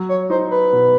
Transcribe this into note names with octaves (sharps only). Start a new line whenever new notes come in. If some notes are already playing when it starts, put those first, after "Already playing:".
Already playing: F#3
C#5
D#4 C5
B4
B2